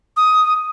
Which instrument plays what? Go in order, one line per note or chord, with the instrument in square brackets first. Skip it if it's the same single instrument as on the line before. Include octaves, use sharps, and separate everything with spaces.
[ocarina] D#6